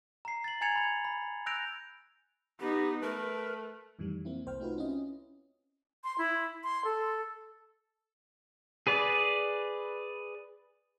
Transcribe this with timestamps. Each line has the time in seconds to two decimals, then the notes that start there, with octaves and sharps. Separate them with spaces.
0.25 A#5 C7
0.44 A6 F#7
0.61 G#5 A#5 G#6 A6 C#7 F7
0.76 B5 G#6
1.05 B5
1.46 E6 F#6 G6 A#6 D7 F7
2.60 B3 D#4 G4
3.02 A3 A#4 B4
3.99 F2 A2 D#3 E3 G3
4.25 A#3 C4 E4
4.46 C2 C5 G5 F6
4.60 A3 D#4 F4 F#4 B4
4.77 C4 C#4 E4 F4 D#5
6.04 C6
6.18 E4
6.64 C6
6.85 A4
8.87 G#4 B4 D5